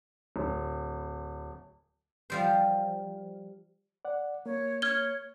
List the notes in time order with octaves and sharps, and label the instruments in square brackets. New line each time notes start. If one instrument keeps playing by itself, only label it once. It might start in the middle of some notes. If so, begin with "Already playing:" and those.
[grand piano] D1
[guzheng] F3 G3 C5
[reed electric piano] D5 F#5
[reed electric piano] A#3 [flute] C#5
[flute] C#5 [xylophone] F6 G#6 G7